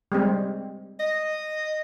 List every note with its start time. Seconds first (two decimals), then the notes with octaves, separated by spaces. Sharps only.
0.12 G3 G#3 C4
1.00 D#5